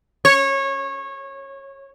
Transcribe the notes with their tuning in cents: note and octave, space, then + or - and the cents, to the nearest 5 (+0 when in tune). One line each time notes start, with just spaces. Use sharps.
C#5 -20